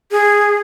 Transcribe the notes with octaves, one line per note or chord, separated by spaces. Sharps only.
G#4